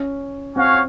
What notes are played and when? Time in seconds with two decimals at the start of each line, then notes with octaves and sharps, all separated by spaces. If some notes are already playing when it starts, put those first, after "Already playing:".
Already playing: C#4
0.55 C4 C#4 F#4 C#5 F5